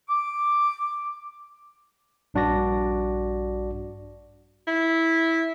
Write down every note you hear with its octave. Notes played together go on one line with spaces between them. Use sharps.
D6
A#1 G2 D4 F#4 D5 A#6
E4